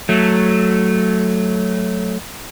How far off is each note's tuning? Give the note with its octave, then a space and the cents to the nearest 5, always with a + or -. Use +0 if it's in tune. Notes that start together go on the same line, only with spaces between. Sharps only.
F#3 +0 A3 +0